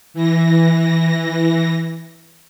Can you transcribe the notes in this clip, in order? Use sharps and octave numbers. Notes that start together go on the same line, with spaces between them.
E3 A#6